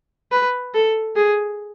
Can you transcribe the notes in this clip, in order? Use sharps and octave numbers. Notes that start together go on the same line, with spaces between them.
B4
A4
G#4